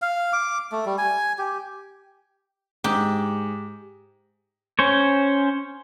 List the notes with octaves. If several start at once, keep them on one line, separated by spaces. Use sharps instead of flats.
F5
D6
A3
G3
G#5
G4
G#2 G4
C#4 C5 C#5